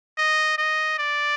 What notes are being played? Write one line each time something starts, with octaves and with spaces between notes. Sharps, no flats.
D#5
D#5
D5